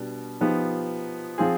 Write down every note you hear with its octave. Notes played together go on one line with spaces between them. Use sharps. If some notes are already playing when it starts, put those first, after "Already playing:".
Already playing: B2 G3 D4
F3 B3 D#4 G4
F3 C4 F4 G#4